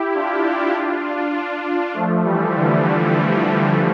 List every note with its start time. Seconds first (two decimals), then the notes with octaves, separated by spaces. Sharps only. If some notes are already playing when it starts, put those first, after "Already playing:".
Already playing: E4 G4
0.14 D4 F4
1.34 D4 F4
1.94 F3 A3
2.24 E3 G3
2.54 D3 F3